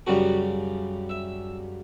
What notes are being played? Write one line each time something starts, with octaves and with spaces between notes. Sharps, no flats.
F#2 C#3 G3 F#4
E5